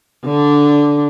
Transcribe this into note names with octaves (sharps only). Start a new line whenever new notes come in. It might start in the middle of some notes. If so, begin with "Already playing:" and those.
D3 D4